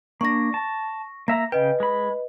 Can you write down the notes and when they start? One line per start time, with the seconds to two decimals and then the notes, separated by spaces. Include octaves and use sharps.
0.21 A#3 D4 C#6 A#6
0.54 A5
1.28 A#3 E5 A#5 A#6
1.52 C#3 B4 D#5 G5
1.80 G#3 B5